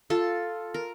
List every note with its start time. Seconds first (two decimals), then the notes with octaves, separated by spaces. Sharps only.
0.10 F4 A4
0.74 A#4